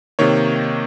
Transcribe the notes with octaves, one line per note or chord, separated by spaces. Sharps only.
C3 D#3 A#3 C#5